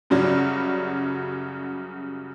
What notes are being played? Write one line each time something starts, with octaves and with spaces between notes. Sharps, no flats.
F#2 C#3 F#3 G3